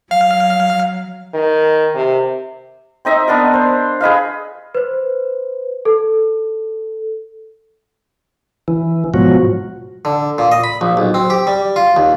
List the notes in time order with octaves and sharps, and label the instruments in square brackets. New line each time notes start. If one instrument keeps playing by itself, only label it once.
[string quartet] F#3 [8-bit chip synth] F5
[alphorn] D#3
C3
[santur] C4 D#4 D#5 E5
B3 D4 A#4
C5
G#4 B4 D#5 F5
[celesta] B4 C5
A4
[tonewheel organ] E3
G#2 B2 F3 F#3 F#4
[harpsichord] D3
A#2
D#5
B5
A#1
B1
C4
G4
G3
F4
D#2